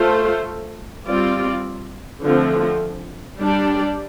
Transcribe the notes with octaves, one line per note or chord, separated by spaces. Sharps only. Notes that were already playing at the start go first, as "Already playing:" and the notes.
Already playing: A3 F4 A4 C5
G3 C4 F4 D5
D3 F3 A3 C4
G3 D4 G4 D5